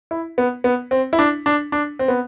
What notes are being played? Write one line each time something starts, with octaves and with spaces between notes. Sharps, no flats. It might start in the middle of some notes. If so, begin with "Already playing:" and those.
E4
B3
B3
C4
E4
D4
D4
D4
C4
B3